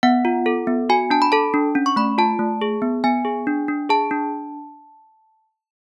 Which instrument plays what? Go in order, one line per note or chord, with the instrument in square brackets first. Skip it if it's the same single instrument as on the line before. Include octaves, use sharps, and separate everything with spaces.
[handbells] B3 F#5
F4
A4
B3
F#4 G#5
D4 A5
B5
A4 A5
D4
C#4
C#6
A3 B5
F4 A5
A3
G#4
B3
B3 G#5
G#4
D4
D4
G#4 A5
D4